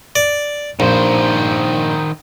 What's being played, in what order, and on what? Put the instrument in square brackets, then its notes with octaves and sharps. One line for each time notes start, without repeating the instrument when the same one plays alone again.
[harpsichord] D5
[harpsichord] A#1 [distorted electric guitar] D#3 C5